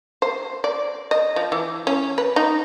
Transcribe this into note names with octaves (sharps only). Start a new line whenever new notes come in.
C5
D5
D#5
F3
E3
C#4
B4
D#4